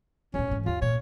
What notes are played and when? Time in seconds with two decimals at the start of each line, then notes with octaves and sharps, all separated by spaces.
0.34 D#2 A2 C#4
0.48 G#2 E3
0.66 D#2 F4
0.82 A#2 C#5